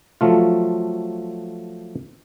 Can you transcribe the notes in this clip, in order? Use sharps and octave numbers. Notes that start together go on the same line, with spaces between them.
F3 F#3 A3 F4